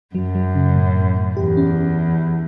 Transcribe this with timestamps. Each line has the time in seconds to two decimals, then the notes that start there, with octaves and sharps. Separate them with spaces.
0.15 F#2 F#3
0.35 F#3
0.55 C#3
0.75 A2
0.96 A2
1.16 A2
1.37 E2 G4
1.57 C#4